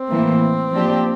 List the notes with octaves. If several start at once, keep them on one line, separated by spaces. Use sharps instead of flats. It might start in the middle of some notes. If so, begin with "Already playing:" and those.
Already playing: C4
A2 E3 A#3
F3 A#3 D4 G4